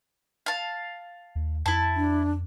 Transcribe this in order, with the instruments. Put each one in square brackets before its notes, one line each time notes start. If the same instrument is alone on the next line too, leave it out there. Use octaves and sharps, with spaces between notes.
[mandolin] F5 A5
[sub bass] D#2
[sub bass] F2 [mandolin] E4 A5
[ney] D4